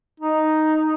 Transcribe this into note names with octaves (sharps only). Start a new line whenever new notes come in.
D#4